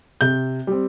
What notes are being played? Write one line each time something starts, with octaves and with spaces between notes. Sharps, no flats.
C3 G6
G3 C4